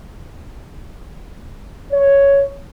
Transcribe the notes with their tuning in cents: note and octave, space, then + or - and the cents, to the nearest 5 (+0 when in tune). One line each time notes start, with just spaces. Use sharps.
C#5 +5